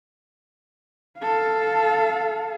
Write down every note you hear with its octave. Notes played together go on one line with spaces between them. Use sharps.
A4 F5